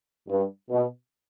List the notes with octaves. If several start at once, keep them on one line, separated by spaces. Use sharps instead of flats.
G2
B2